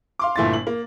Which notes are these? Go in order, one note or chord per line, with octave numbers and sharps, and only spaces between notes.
F5 C6 D6
G1 A#2 A3 E4 C6 A6
F#7
A#3